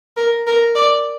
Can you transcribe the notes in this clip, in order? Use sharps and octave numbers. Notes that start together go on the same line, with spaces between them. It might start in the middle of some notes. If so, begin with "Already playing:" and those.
A#4
A#4
D5